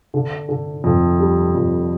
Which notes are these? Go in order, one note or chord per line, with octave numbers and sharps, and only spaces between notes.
D3
D3
F2
G3
F2